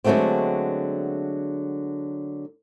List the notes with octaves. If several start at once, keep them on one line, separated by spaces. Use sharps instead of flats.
D3 F#3 G#3 A3 B3 C4